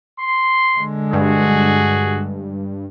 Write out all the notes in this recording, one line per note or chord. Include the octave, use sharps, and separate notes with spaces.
C6
D3 G#3
G2 F#4 G#4